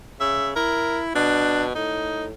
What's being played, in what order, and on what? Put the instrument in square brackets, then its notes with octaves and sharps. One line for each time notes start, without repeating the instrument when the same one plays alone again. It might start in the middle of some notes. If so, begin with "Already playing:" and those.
[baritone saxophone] C#3 [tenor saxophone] E5
[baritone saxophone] E4 [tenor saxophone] A#4
[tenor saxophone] B2 [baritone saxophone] D4
[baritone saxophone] A2 [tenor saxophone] D#4